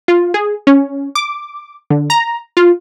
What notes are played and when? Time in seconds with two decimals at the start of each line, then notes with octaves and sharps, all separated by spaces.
0.08 F4
0.34 G#4
0.67 C#4
1.15 D6
1.90 D3
2.10 A#5
2.57 F4